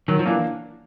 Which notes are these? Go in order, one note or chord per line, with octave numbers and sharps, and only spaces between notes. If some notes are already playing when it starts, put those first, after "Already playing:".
D#3 F#3
F3
E3 A#3 D4